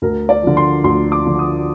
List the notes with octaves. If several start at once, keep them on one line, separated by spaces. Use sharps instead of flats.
D2 A#4
D5
D3 F3
C6
D2 C6
D6
D3 F3
D#6